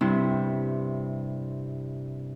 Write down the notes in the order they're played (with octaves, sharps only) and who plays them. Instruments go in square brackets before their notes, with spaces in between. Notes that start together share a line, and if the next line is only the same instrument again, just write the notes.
[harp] G2 C3 E4